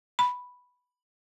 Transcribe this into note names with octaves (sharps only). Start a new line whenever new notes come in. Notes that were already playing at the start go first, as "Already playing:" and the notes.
B5